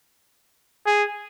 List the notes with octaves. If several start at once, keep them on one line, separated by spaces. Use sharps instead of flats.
G#4